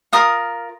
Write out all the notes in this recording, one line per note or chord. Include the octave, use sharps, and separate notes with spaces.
F4 A#4 D#6